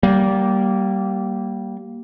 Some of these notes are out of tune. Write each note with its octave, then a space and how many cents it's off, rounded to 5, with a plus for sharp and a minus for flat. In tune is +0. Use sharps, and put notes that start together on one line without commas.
G3 -20 A#3 +0